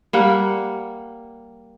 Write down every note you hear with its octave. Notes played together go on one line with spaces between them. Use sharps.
G3 A#3 F#5